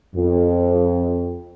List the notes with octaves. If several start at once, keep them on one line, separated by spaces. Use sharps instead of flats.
F2